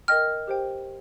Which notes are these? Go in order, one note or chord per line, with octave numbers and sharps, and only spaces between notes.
A#4 D#5 G5 F6
G4 C5 G5